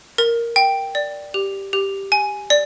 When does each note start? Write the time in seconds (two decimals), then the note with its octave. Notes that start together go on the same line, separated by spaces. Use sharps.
0.18 A#4
0.56 G5
0.95 D5
1.34 G4
1.73 G4
2.12 G#5
2.50 D5